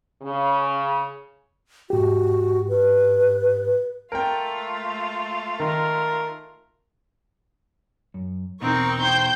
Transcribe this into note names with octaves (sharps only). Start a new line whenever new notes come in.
C#3
G#2 F#4 G4
B4
A3 F4 A#4 G5
D#3 A#4
F#2
E2 B2 C4 D#4 A#4 C#6
C5 G5 G6